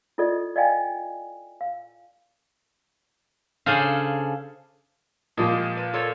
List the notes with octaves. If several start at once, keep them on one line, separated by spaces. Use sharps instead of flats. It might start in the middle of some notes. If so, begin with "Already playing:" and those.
E4 F4 A4 D5 D#5
D5 D#5 F5 G5 G#5
F5
C#3 D4 G#4 A4 C5 F5
A#2 F3 G#3 A#3 G4 F5
B4
F4 A4 C#5